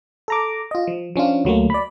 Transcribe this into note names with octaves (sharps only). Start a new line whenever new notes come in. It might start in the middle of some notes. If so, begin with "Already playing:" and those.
A4 A#5 D6
F4 D#5
F3
F3 C#4 D4 F4
D2 F#3 A3 A#3
D5 B5